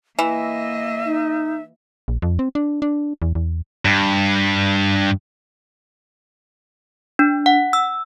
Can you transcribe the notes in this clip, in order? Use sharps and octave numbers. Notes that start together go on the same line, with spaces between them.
E3 A#3 D#5 E5
D#4
A#1
F2
C4
D4
D4
E2
E2
G2
D4
F#5
E6